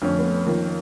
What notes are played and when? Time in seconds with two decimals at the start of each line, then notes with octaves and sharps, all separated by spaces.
0.02 F2 D3 A3 C#4
0.18 A3 B3
0.46 D#3 F3 A#3